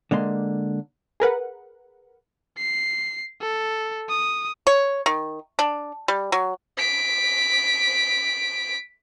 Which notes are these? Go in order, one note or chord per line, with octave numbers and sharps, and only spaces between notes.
D3 G#3 A#3 C6
G#4 A#4 B4 F#5
C7
A4
D#6
C#5
D#3
D4
G3
F#3
B6 D7